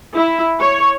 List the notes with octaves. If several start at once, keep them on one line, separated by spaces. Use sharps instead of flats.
E4
C#5